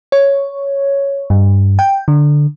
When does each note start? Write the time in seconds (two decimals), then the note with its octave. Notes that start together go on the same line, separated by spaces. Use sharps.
0.12 C#5
1.30 G2
1.79 G5
2.08 D3